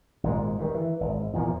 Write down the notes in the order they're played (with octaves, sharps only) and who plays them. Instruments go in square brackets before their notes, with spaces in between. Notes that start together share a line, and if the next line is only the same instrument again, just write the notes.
[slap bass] G#1 A#2 G#3
G2 D#3
E3
G#1
E2 A#2 F3